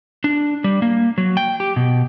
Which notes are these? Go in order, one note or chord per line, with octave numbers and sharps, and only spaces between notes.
D4
G3
A#3
F#3
G5
G4
B2